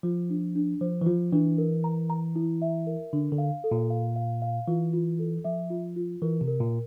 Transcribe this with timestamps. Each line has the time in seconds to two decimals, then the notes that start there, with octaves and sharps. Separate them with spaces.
0.03 F3 F4
0.30 D4
0.55 D4
0.81 F3 C5
1.01 E3
1.06 F3 F4
1.32 E3 D4
1.58 A#4
1.84 A#5
2.10 A#5
2.36 E4
2.62 E5
2.87 A#4
3.13 D3 D4
3.32 D3
3.38 F5
3.64 A4
3.71 A#2
3.90 F5
4.16 F5
4.42 F5
4.68 E3 F4
4.93 F4
5.19 A4
5.44 F3 E5
5.70 F4
5.96 F4
6.22 E3 A#4
6.41 C3
6.47 A#4
6.60 A#2